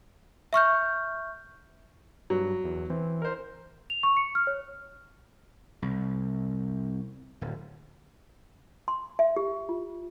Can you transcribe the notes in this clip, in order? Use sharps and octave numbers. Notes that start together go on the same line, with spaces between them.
E5 C#6 F6 G6
G2 F#3
E2
E3 C4
A#4 C5
F7
C#6
C#7
F6
C#5
C2
D1
C6
E5
G4
F4